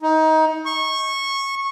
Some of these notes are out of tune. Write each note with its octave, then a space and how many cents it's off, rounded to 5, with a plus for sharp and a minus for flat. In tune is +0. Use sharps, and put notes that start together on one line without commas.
D#4 +25
C#6 -15